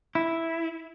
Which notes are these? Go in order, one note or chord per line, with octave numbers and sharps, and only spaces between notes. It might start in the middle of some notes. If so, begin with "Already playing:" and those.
E4